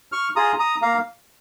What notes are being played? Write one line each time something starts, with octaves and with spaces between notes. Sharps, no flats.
C#6 F6
F4 G#4 A#5 D#6
A#5 D#6
A#3 F5 A#5